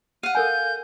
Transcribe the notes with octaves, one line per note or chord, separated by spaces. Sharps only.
F5 F#5 D#7
A4 A#4 G#5 G6